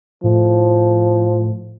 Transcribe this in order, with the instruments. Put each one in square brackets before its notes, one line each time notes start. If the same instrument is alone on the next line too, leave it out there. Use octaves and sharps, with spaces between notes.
[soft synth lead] A2 [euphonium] F3